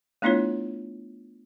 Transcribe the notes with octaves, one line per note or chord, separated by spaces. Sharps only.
A3 B3 D4 E4 F4 C#5